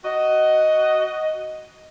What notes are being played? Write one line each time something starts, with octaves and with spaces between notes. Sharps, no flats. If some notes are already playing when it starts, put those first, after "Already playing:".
F#4 D#5